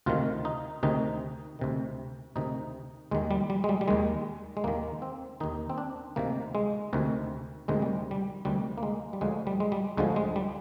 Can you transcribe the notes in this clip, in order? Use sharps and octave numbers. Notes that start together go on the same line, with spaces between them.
D2 C3 D#3 F4
D#4
D2 C3 D#3 D#4
D2 C3 D#3
D2 C3 D#3 D#4
D#2 D#3 G#3
G3
G3
G#3
G3
G3
D#2 D#3 G#3
G#3
D#2 D#3 A#3
C4
D#2 D#3 D#4
C4
D4
D2 C3 D#3 A#3
G#3
D2 C3 D#3
D2 C3 D#3 G#3
G3
G3
D2 C3 D#3 G3
A#3
G#3
G3
D2 D3 F3 G#3
G3
G#3
G3
D2 D3 F3 G#3
G#3
G3